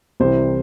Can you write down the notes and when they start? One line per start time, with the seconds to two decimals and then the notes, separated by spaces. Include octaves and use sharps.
0.20 C2 C3 E3 C5